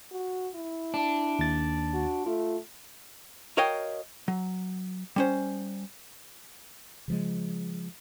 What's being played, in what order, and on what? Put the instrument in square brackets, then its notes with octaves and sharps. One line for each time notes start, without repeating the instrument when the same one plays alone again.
[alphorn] F#4
E4
[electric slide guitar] D4
[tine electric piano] D#2 A6
[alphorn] F#4
[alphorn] A3 [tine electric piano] F4
[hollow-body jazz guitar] F#4 A#4 C#5 D#5 F5 G5
F#3
G3 C#4 C5
[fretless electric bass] C#3 F3 G#3